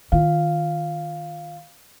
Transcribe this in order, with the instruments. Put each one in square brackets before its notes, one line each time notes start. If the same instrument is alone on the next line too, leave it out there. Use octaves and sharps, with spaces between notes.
[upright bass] D#3 F4 [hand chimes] F5